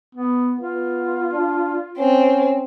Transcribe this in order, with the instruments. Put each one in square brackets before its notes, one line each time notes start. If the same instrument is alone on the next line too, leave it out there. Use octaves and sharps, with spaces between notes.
[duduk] B3
[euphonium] B3 [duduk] F4
[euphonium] D4
[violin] C4 [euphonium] C#4